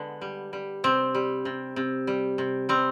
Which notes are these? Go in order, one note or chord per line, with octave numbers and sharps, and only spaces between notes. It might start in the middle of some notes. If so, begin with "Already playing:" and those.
Already playing: D3 G#3 B3 D4
G3
G3
C3 C4
G3
C3
C3
G3
C3
G3 C4